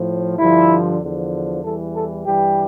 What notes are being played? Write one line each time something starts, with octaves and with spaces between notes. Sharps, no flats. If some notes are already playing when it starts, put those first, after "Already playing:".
Already playing: A2 F3
G2 D3 F3 E4
E2 D3 F3
E2 E3 G3 A4
A4
G2 E3 G3 G4